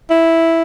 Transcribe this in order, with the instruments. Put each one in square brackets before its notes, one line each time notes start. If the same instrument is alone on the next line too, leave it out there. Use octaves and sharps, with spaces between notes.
[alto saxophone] E4